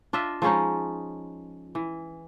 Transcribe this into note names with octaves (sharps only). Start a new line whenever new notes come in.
D4 F4 D#5 E5
F3 G#3 C#4 D#4
E3